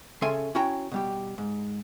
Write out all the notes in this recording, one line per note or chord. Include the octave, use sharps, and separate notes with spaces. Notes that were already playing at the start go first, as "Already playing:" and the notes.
C#3 C#4 A4 E5 G#5 C6
C#4 E4 F#4 C#5 G5 A#5
B2 G3 G4
G#2